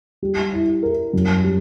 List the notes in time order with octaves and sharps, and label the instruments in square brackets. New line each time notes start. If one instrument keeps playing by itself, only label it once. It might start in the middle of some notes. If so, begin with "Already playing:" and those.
[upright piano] G3
E4
A#4
F#2
G3